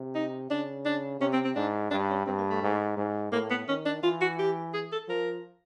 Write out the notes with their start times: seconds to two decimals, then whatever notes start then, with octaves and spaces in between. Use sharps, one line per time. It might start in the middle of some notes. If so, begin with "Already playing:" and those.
Already playing: C3
0.15 D#4
0.50 C#3 D4
0.85 D4
1.20 C3 C#4
1.33 C4
1.45 C4
1.55 G#2 D4
1.91 G2 D4
2.10 C#4
2.27 G2 C4
2.38 A#3
2.50 A3
2.62 G#2
2.97 G#2
3.32 A2 A#3
3.50 B3
3.67 D#3 C#4
3.85 D4
4.03 E3 F4
4.21 F#4
4.39 G4
4.74 G#4
4.92 A4
5.09 F3 A#4